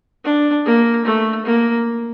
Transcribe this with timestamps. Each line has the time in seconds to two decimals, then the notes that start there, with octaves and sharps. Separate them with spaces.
0.24 D4
0.65 A#3
1.05 A3
1.45 A#3